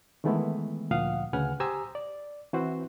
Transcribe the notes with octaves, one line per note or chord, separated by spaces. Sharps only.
D#3 E3 G#3 A3 B3 E4
D2 A#2 F3 F5 F#5 D#6
D2 C#3 B4 F#5 G#5 F6
G4 C5 G#5 A#5 D#6 E6
D5
E3 C4 E4 F#4 B4 C5